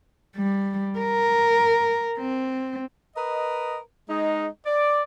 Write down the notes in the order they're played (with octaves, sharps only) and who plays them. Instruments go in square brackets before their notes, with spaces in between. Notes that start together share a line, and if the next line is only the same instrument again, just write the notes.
[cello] G3
A#4
C4
[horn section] A#4 B4 D#5
G#3 D#4
D5